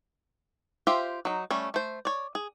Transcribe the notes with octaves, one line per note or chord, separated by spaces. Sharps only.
F4 G4 C5 E5
F#3 D#4
G3 A3 C#4
A3 C5
C#5 D5
G#4